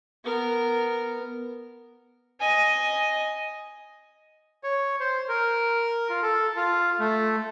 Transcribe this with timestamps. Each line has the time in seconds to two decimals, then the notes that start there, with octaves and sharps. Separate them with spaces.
0.25 B3 A#4
2.40 D#5 G#5
4.64 C#5
5.00 C5
5.29 A#4
6.10 F4
6.22 A4
6.57 F4
7.00 A3